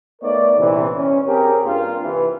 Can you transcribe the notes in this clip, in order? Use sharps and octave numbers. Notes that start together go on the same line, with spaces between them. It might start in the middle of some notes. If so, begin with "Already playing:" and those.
A3 B3 D#4 A#4 C#5 D5
A#1 C3 E3
C#4
C4 G4 G#4 A#4
G2 A#3 F4 F5
C3 E3